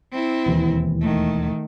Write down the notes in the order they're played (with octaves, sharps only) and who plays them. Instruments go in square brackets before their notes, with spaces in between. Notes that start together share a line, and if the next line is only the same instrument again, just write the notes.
[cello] C4 E4
[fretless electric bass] E1 D#2 E3
[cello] D#3 A3